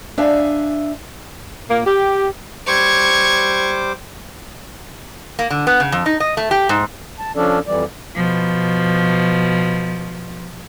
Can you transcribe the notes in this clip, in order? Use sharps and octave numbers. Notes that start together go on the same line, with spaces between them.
D4 E5 F5 G#5
A#2 A#3
G4
G3 C5 C#6 D6 G#6
A#3
D3
B3
C#3
F2
D#4
D#5
A3
G4
G#2
A5
F3 C#4 D4 A4 D5
F2 E3 G3 D5
B2 F3